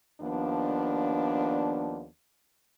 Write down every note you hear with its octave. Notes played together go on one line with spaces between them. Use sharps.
D#2 F3 B3 D4